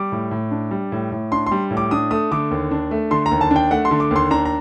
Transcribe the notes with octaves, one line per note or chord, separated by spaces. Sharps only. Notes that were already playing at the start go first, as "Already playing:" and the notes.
Already playing: G3 D6
A2
A2
D4
G3
A2
A2
D4 C6
C6
G3
A2
D6
D4 D#6
A3 D#6
D3 D6
D#2
D4
A3
D3 C6
A#5
D#2
A5
D4
G5
A3 F#5
C6
D3
D6
D#2
C6
D4 A#5
A#5